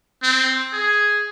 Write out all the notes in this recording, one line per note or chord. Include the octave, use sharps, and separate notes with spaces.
C4
G#4